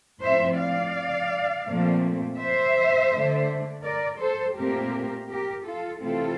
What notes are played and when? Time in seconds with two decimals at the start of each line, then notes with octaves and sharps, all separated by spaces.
0.21 A2 F3 C4 C5 E5
0.57 D5 F5
1.66 A#2 F3 A3 C4
2.38 C5 E5
3.12 D3 A3 D4
3.83 A#4 D5
4.20 A4 C5
4.57 A#2 A3 C4 G4 A#4
5.29 G4 A#4
5.65 F4 A4
6.01 C3 E3 A3 C4 F4 A4